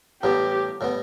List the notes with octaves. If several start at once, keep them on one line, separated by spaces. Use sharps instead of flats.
A1 A2 G3 B3 G4
A2 G3 B3